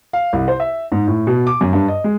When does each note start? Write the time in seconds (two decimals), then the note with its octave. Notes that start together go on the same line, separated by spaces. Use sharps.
0.13 F5
0.33 C2
0.48 C5
0.60 E5
0.92 G#2
1.07 A2
1.27 B2
1.47 D6
1.61 F#2
1.73 G2
1.88 D#5
2.04 G#3